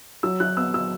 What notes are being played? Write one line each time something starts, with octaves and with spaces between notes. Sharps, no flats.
F#3 E6
F#3 F#6
B3 E6
F#3 E6